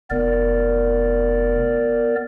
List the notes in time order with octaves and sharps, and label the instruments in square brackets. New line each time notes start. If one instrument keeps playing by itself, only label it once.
[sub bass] F1 [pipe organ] B3 A#4 D5